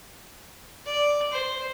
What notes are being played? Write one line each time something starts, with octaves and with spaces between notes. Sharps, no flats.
D5
C5